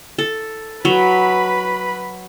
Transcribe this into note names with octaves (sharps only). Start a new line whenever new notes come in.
A4
F#3 B4 B5